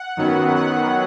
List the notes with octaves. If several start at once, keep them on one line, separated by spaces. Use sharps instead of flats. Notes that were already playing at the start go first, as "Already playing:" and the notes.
Already playing: F#5
F#2 D#3 F#3 B3
F#5